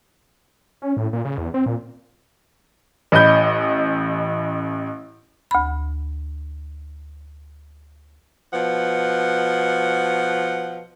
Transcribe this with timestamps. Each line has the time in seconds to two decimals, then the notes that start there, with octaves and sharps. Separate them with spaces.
0.82 C#4
0.97 A2
1.13 A#2
1.25 C#3
1.38 E2
1.54 C4
1.66 A#2
3.12 A1 D#5 B5 G6
5.51 D2 B5
8.53 B2 F3 F#5